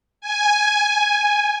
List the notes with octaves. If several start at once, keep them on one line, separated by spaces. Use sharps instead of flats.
G#5